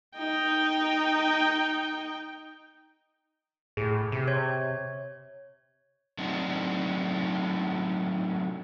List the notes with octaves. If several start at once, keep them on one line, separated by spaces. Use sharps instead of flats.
D#4 G5
A2 G#4
C3
C#5 G#6
F#3 A3 C4 D4 D#4